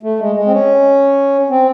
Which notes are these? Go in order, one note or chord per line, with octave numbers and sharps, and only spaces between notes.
A3
G#3
G#3
C4
C#4
C4